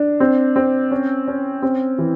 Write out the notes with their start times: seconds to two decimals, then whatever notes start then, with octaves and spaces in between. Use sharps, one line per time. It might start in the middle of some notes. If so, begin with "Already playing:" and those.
Already playing: D4
0.20 C4
0.56 C4
0.91 C#4
1.28 C#4
1.62 C4
1.98 E3